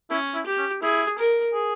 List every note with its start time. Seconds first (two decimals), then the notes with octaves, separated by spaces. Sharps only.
0.10 C#4 E4
0.34 E4
0.46 G4
0.58 C#4
0.82 E4 G#4
1.18 A#4
1.54 G#4